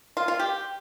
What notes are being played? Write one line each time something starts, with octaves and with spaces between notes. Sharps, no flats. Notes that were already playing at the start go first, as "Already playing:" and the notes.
F4
F4
G4